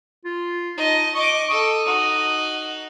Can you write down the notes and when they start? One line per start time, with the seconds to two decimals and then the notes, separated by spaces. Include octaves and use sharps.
0.25 F4
0.77 D#4 D#5 A5
1.15 D#5 C#6 D6
1.50 A4 D#6
1.85 D#4 F#4